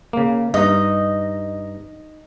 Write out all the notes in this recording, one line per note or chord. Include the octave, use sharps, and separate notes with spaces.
C#3 A#3
G2 D#4 D#5